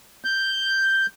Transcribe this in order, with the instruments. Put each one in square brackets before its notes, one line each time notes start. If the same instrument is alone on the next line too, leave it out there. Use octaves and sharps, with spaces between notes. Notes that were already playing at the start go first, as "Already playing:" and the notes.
[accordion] G6